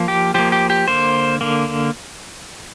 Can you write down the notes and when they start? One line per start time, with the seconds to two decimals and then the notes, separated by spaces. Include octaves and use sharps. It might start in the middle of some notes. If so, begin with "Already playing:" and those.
Already playing: F3 A#3
0.08 G4
0.34 F3 A#3 G4
0.52 G4
0.70 G4
0.87 D3 A#3 C5
1.41 D3 A#3